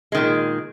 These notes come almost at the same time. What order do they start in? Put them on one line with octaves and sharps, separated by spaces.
G#3 D#3 A#2